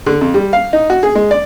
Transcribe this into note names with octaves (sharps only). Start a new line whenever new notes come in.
D3
F2
G3
F5
D#4
F#4
G#4
G#3
D5